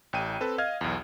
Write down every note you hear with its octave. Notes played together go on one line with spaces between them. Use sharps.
A1 G5 D#7
C4 A4 B4
D#5 F5 F6 G#6
B1 E2